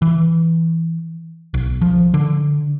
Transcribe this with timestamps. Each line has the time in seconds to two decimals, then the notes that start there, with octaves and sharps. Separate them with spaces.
0.02 E3
1.54 B1
1.81 F3
2.14 D3